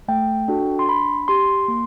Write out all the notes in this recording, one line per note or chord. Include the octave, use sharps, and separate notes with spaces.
A3 G5
D4 F#4 A4
C6
D4 B5
G4 C6
A#3